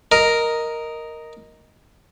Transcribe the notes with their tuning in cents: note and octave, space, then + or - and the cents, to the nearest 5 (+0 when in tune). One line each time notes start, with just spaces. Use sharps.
A#4 +0 D#5 +0